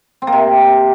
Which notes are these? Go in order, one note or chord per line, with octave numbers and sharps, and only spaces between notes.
C4
A#3
C3